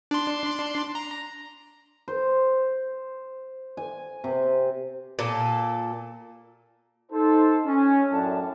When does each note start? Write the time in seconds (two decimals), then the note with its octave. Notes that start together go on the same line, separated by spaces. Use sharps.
0.11 D4 C6
0.95 A#5
2.08 C5
3.77 G#5
4.24 C3
5.19 A#2 A4
7.12 D#4 A4 C5
7.65 C#4
8.12 F#2 A2 D4 A5